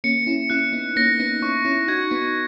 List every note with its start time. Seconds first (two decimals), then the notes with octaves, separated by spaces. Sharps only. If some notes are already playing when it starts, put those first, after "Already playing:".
0.04 A#3 C#4 C#7
0.27 C#4 E4
0.50 C#4 E4 F#6
0.73 B3 D#4
0.96 A#3 C#4 A#6
1.19 B3 D#4
1.42 C#4 E4 C#6
1.65 C#4 E4
1.88 D#4 F#4 G#6
2.11 B3 D#4